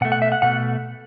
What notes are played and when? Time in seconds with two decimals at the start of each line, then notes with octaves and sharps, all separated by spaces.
0.01 B2 F#5
0.05 A3
0.12 F#5
0.22 E5
0.32 F#5
0.42 B2 A3 F#5